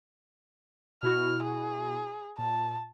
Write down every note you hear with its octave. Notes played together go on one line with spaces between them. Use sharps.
B2 E4 F#4 F6
G#4
A#2 A5